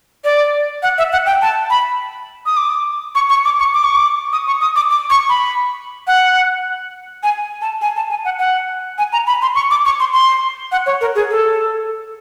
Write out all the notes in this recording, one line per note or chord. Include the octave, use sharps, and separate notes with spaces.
D5
F#5
E5
F#5
G5
A5
B5
D#6
D6
C#6
C#6
D6
C#6
D6
C#6
D6
D#6
C#6
D#6
D6
D6
C#6
B5
F#5
G#5
A5
G#5
A5
G#5
F#5
F#5
G#5
A#5
B5
C6
C#6
D6
C#6
C6
C6
F#5
C#5
A#4
G#4
A4